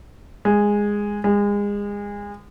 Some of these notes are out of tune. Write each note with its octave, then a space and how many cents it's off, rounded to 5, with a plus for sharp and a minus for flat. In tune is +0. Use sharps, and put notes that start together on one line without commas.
G#3 -10
G#3 -30